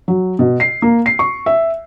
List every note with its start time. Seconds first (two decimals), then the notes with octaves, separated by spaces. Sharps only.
0.08 F#3
0.39 B2
0.60 C7
0.82 A#3
1.06 C7
1.19 C#6
1.46 E5